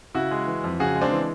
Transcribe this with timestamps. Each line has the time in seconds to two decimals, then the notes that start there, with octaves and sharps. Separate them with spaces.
0.15 C#3 E4 F#4
0.31 G#3
0.47 E3
0.64 F2
0.80 C#3 F#4 G#4
0.96 G#3
1.01 C4 D4
1.12 E3